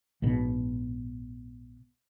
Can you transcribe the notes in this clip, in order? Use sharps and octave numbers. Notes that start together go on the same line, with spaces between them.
A#1 G#2 B2